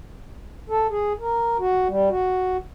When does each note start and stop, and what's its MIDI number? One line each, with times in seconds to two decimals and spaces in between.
0.70 0.87 69
0.90 1.13 68
1.20 1.57 70
1.59 1.88 66
1.88 2.09 55
2.09 2.57 66